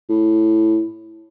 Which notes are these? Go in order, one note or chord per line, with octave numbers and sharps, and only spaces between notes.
A2